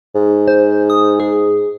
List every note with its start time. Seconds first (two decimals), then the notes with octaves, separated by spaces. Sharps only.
0.15 G#2
0.48 C5
0.90 D#6
1.20 G#4